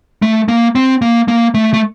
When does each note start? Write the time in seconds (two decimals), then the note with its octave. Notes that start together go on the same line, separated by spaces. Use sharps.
0.22 A3
0.48 A#3
0.75 C4
1.02 A#3
1.28 A#3
1.54 A3
1.74 A3